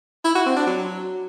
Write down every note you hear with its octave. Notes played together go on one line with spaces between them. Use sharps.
E4
F#4
C4
D4
F#3